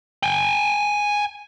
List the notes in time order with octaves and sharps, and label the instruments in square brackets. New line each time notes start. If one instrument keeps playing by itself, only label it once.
[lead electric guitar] G5 G#5